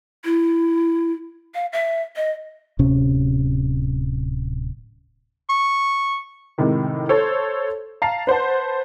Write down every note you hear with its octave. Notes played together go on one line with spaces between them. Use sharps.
E4
F5
E5
D#5
D1 C3 C#4
C#6
A2 C3 D#3 G#3
A4 C5 C#5
F5 A5 A#5 C7
B4 C5 F#5 A5